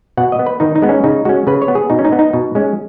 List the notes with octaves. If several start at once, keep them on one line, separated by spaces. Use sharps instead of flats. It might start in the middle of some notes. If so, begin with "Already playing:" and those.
B2 F#5
D#5
B3
B4
D#3 D#4
D#4
G#3 B3
C#4
C#3 D#4
G#3 C#4 F#4
C#3 B4
C#5
B3
G#4
B2 D#4
C#4
D#4
B3
D#4
B2
G#3 C#4